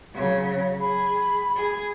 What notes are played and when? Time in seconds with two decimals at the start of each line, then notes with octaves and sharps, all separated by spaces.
0.15 C#3 F#3
0.80 G#4 B5
1.57 G#4